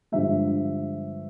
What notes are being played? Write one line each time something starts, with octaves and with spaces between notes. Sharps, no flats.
G2 D3 F3 G#3 E5